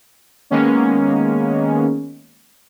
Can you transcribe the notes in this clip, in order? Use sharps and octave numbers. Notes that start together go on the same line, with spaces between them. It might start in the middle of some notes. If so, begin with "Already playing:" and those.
D#3 G#3 A#3 B3 C#4